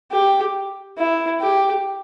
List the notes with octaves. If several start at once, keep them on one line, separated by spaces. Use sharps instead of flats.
G4
E4
G4